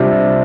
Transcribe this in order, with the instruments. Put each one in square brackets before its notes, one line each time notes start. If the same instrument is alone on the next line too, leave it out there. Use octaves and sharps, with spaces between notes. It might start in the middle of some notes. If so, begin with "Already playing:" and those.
Already playing: [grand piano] C3 G3 D4 F4